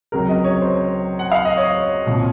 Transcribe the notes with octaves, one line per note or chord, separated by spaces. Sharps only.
C#2 C3 F#3 A#4
D#5
C#5
C5
F#5
F5
D#5
C#5
C2 A#2 F3